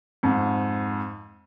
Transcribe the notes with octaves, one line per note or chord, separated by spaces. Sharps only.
F2 G#2